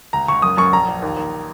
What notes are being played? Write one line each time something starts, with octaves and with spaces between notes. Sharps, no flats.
C#2 A#5
C#2 C#6
F#2 D#6
F#2 C#6
A#1 A#5
A#1
D#2
D#2